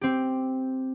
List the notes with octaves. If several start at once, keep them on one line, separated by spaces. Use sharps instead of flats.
C4 G4